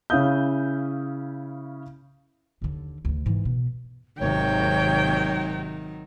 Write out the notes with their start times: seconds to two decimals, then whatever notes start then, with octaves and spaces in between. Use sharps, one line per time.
0.10 C#3 C#4 E4 F5 D#6 G6
2.62 D#2 D3
3.05 D2 D3
3.26 G#2 E3
3.45 B2
4.20 G#1 C3 D#3 F#3 C#5 G5